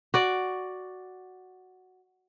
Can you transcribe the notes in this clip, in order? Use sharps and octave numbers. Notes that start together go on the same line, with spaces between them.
F#4 D5